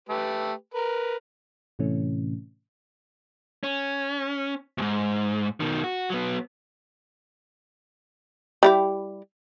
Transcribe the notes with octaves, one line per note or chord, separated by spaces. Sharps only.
A3 G4 B4
A#4 B4
A2 C3 E3 A3 C#4
C#4
D#2 G#2
B2 D#3
F#4
F#3 B3
G3 E4 G4